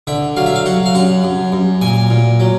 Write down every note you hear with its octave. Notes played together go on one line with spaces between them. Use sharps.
D3 E5
F#3 F5
E5
F5
F#3 F#5
F5
F#2 F#5
F#2
F#2
A#2 G#5
A#2
F#3